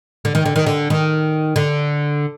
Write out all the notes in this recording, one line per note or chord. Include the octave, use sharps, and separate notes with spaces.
D3
D#3
D3
D#3
D3
D#3
D3